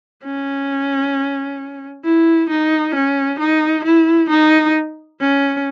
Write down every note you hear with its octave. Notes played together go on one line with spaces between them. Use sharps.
C#4
E4
D#4
C#4
D#4
E4
D#4
C#4